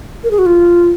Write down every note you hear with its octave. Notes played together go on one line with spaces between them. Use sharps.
A#4
G#4
F#4
F4